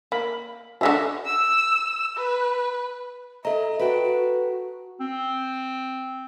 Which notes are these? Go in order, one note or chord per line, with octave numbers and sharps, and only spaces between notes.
A#3 B5
D3 G#3 D4 F#4 E5
E6
B4
A4 D#5 E5 A#5
F#4 B4 G5 A5
F#4
C4